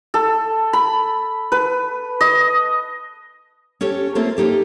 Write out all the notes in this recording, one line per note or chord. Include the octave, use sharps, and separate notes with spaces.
A4
B5
B4
D#5
C#4 G4 A4 C#5
A3 A#3 C4 C#4 F4
A#3 D#4 G4 A4